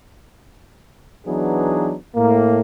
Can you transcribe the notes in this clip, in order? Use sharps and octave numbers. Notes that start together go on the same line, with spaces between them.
E3 F#3 B3 D4 D#4 G#4
A2 A#3